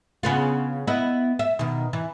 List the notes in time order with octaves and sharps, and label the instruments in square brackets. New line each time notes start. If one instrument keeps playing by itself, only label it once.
[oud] C#3 B3 F4
B3 E4 D#5
E5
B2 D#3
E3